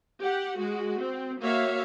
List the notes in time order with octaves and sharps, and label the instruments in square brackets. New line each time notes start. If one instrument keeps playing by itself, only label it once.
[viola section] G4 F#5
G#3 F#4
C4
A#3 F#4 C#5 E5 F5